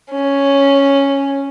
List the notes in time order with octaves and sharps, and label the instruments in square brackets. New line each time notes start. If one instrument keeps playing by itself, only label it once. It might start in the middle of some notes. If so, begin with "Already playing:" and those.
[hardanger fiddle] C#4